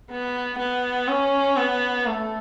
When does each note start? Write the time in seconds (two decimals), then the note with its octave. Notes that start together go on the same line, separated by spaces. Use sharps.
0.11 B3
0.59 B3
1.08 C#4
1.57 B3
2.06 A3